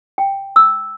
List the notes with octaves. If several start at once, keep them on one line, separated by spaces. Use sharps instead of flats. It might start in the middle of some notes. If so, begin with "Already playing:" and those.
G5
E6